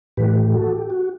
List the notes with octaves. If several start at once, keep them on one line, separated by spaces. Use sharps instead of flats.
A2 E3 A3 G4 B4
G4
F#4 A4
G4
F#4